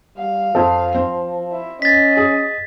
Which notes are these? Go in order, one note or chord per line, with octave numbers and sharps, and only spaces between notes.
G3 F5
F2 F3 C4 A4
C4
E4
C#4 D#5 A6 B6
G#4